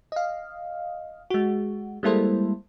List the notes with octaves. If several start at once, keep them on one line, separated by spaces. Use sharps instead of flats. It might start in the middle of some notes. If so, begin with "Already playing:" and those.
D#5 F5
G#3 F#4
G3 G#3 A#3 E4 A4 C5